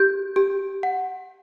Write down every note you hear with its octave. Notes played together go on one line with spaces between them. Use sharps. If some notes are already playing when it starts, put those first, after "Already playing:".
Already playing: G4 G6
G4
F#5